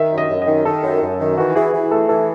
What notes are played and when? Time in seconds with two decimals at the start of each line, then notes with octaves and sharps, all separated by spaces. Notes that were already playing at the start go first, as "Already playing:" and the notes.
Already playing: D#3 E5
0.12 F#2
0.18 D#5
0.29 F#2
0.42 D#3 D#5
0.65 D#3 A4
0.83 F#2
1.02 F#2
1.20 D#3
1.37 E3 F#4
1.55 E3 G#4
1.73 E3
1.91 A3 A4
2.09 E3 A4